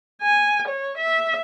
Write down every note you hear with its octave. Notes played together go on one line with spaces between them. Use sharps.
G#5
C#5
E5